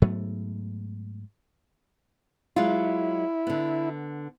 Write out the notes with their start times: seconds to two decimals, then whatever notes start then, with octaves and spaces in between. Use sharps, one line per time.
0.02 G#2 F#3 A3 B3
2.56 F#3 G#3 E4 F4
3.47 D3 B3